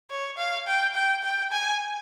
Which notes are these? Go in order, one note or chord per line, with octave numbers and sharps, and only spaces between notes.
C#5
F5
G5
G5
G5
G#5